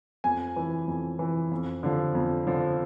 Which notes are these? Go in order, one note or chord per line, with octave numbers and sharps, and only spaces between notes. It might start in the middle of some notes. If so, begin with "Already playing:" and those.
F2 G#5
E3
F2
E3
F2
D3 F3
F2
D3 F3